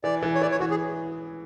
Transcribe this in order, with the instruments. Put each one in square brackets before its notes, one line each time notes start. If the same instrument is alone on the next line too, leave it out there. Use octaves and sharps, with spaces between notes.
[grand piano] E3 [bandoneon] D5
[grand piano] E3
[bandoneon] C#5
[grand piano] E3 [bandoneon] D5
[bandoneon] C#5
[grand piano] E3 [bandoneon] F#4
[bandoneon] G#4